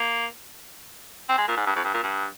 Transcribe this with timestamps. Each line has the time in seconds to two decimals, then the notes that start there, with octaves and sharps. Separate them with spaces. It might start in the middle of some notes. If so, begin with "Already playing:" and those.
Already playing: A#3
1.29 C4
1.38 G#3
1.48 A#2
1.57 G#2
1.66 G2
1.76 F2
1.84 G2
1.94 A#2
2.03 G2